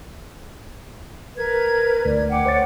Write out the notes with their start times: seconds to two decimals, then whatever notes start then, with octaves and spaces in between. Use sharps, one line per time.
1.36 A#4 B4 G#6
2.05 D2 D5
2.30 F#5 G5 D6
2.46 C5 C#5 A6